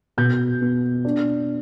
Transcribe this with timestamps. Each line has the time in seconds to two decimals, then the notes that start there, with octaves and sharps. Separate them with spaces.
0.17 B2 G6
0.61 B3
1.05 D4